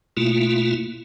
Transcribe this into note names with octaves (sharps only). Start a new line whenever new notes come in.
B2 A3 A#3 E4 F4